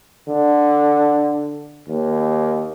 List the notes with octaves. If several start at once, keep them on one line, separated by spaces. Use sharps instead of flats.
D3
D#2